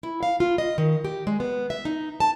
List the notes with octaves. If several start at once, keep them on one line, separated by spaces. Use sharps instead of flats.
E4
F5
F4
D#5
D#3
G4
G#3
B3
E5
D#4
A5